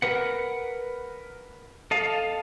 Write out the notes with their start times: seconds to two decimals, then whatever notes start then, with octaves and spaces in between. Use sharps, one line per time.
0.02 A#4 B4 F#5
1.91 A4 D#5 F5 A5